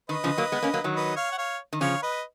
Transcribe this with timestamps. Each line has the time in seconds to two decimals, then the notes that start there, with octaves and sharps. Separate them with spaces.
0.09 D#3 B4 D#5
0.24 C#3 F3
0.38 F#3 A#3
0.52 G#3 B3
0.62 A#3 C#4
0.74 F#3 A#3
0.84 D#3 F#3
0.96 B4 D#5
1.16 C#5 F5
1.32 F#5
1.38 C#5 F5
1.73 D#3
1.81 C#3 F3 C#5 F5
2.02 B4 D#5